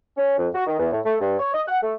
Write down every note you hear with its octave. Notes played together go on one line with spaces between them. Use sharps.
C#4
F2
F#4
D#3
E2
A2
A3
G2
C#5
D#5
F#5
A3